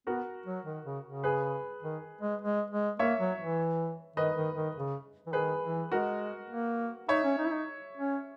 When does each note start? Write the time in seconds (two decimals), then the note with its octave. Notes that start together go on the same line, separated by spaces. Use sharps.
0.07 B3 F#4 A#4
0.46 F#3
0.65 D#3
0.85 C#3
1.04 C#3
1.24 G#4 B4
1.83 D#3
2.21 G#3
2.42 G#3
2.70 G#3
2.99 A#3 C#5 E5
3.20 F#3
3.39 E3
4.16 D#3 B4 D#5
4.36 D#3
4.55 D#3
4.75 C#3
5.27 E3
5.33 D#3 G#4 B4
5.63 E3
5.92 G#3 F#4 A#4
6.50 A#3
7.09 D#4 C#5 E5
7.24 C#4
7.38 D#4
7.46 E4
7.52 D#4
7.97 C#4